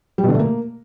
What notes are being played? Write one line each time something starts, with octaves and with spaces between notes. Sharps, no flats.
G3
B2
D3
A3
A#3